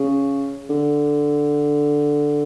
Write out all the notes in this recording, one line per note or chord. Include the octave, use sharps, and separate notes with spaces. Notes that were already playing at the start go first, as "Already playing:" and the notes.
Already playing: C#3
D3